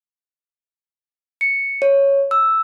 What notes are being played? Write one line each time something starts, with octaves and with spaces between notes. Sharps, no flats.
C#7
C#5
E6